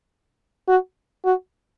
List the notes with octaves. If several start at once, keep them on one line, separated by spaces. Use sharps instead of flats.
F#4
F#4